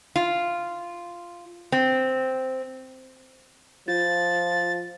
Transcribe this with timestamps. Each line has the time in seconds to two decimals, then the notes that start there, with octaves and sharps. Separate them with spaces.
0.16 F4
1.72 C4
3.88 F3 F4 A6